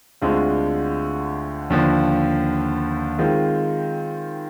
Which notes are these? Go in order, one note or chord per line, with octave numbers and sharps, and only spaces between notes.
D2 D3 G#3 C4 F4
D#2 D3 F3
D#3 G#3 C4 F4